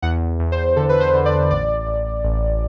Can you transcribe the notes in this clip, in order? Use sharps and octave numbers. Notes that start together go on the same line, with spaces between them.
E2 F#5
E2
C5
D3 A4
B4
C5
D3
D5
A1 D5
A1
A1